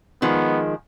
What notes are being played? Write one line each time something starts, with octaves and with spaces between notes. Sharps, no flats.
D#3 F3 G#3 B3